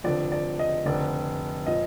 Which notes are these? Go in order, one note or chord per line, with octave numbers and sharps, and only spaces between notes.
F1 F2 D3 F3 D5
D5
D#5
F1 F2 D3 F3 D5
A#2 F3 D#5